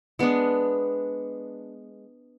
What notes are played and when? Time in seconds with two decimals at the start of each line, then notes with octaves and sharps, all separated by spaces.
0.19 G#3 B3 D4